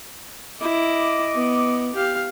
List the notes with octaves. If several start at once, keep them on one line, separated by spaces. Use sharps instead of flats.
E4 D#5 D6
B3
G4 F5